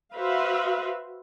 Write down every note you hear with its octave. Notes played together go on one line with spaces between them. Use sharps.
F#4 B4 C5 E5 F5